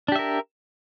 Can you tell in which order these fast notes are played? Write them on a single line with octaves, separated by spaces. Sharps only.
D4 G4 E5 A#4